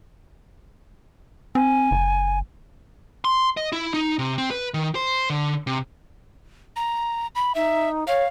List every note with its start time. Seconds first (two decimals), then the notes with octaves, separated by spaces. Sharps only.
1.55 C4 G#5
1.91 F#1
3.25 C6
3.57 D#5
3.72 E4
3.94 D#4
4.19 C3
4.38 C4
4.51 B4
4.74 D#3
4.95 C5
5.30 D3
5.67 C3
6.76 A#5
7.35 B5
7.55 D#4 E5
8.07 C#5 F5